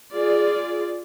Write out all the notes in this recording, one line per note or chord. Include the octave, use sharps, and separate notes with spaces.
F4 G#4 D5